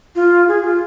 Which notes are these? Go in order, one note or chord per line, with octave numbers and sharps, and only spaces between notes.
F4
G#4
F4